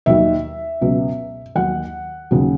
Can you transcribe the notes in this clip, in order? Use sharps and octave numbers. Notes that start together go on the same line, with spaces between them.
D#2 D#3 F#3 E5
C#2 B2 F#3
D#2 D#3 F#3 F#5
D#2 C#3 F#3